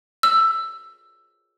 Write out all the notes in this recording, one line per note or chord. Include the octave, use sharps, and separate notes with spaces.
E6